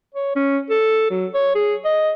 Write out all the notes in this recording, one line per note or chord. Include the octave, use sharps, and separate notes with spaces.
C#5
C#4
A4
F#3
C#5
G#4
D#5